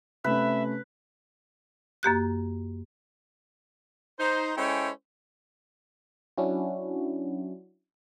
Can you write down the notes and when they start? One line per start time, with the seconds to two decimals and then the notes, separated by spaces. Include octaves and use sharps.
0.24 C3 A3 C#4 B4 E5
2.03 F#2 A#3 G4 F#6
4.20 D#4 C5
4.57 G#3 C#4 E4 A4 C5 G5
6.37 F#3 C#4 D4 E4 F#4